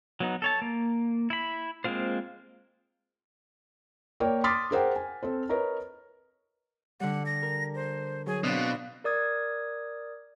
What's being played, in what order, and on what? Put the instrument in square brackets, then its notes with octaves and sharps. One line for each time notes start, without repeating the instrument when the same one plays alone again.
[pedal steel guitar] F#3 B3 D#4
A4 C#5 A5
A#3
E4 B5
G#3 A#3 C4 F4 C5
[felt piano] A#3 A#4 C#5 D5 G5
C6 D6 D#6 F6 A6 B6
G#4 A#4 C5 F#5 G5
G#5
C4 A4 C5
A#4 B4 C#5 D#5 A#5
[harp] D3 G3 [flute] F#5
[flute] A#6
[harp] A#4
[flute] C5
[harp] F#3 [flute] G#4
[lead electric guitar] B2 [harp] C4 F5 [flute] D4
[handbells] A#4 D5 D#6 G#6